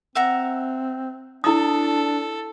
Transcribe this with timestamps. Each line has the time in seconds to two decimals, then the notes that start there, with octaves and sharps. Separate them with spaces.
0.15 C4 E5 F#5 A#5
1.44 D4 E4 A4 D#6